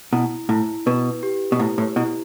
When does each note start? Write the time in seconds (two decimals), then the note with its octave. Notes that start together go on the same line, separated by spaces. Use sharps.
0.13 B2 E4
0.49 A2 E4
0.86 B2 B4
1.23 G4
1.52 B2
1.59 A2 E4
1.78 A2
1.96 B2 E4